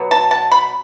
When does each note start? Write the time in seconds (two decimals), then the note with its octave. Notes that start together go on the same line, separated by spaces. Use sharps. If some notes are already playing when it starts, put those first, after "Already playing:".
Already playing: B2 F#3
0.11 A5
0.31 A5
0.51 B5